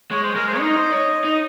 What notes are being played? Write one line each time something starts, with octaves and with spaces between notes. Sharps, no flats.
G#3 C#5
C5
G#3 A#4
C5
C#5
D#4 D#5
C5
C#5
D#4